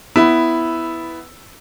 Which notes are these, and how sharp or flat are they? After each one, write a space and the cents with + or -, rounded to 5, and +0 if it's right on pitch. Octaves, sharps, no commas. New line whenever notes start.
B3 +10 E4 +0